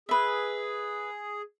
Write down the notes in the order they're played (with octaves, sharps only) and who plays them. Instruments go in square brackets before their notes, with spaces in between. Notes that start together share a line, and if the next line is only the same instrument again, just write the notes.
[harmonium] G#4 [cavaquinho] B4 E5